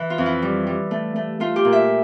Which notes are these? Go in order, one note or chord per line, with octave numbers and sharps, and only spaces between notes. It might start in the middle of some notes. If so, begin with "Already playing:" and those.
Already playing: E3
F4
F2
E4
G3
G3
A3
A3
A3 F4
G4
A#2
E5